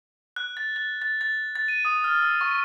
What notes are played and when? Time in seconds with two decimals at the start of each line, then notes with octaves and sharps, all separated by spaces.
0.36 F#6
0.57 A6
0.76 A6
1.02 A6
1.21 A6
1.56 A6
1.68 D#7
1.85 D#6
2.04 F6
2.22 E6
2.41 C#6